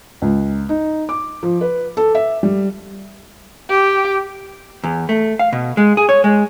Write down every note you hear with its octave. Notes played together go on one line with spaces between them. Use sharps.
C#2
D#4
D6
F3
B4
A4
E5
G3
G4
E2
A3
F5
B2
G#3
G#4
C#5
G#3